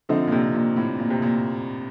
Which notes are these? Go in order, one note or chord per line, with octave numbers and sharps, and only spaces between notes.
D3 F3 A3 C4 D#4
A#2
C3
A#2
A2
A#2
C3
A#2